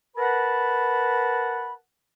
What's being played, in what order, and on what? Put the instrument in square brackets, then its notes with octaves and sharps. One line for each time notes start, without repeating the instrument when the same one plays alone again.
[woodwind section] A#4 B4 F#5 A5 B5